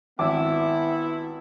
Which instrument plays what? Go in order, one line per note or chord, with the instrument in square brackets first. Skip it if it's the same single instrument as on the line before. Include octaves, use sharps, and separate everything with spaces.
[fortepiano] G#1 D6 [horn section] B3 E4 E5